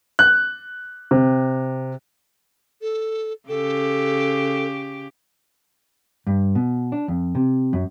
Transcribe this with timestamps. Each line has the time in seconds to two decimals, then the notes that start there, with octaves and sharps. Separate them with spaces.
0.19 F#6
1.11 C3
2.82 A4
3.49 C#3 G4 A4
6.27 G2
6.55 B2
6.92 D4
7.08 F2
7.35 C3
7.73 F#2